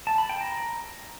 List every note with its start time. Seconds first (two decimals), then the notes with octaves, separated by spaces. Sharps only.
0.07 A5
0.18 B5
0.29 G5
0.41 A#5